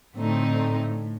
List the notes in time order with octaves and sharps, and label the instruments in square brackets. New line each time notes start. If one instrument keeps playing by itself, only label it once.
[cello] A2 [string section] D3 A3 C4 D#4